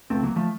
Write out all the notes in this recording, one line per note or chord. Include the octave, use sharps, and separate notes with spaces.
C#2 C3 A3 C4
F#3 A#3
F3 A3